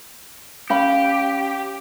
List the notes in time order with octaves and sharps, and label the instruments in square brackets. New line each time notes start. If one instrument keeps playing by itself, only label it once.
[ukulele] C#4 F5 B5 [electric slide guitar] G4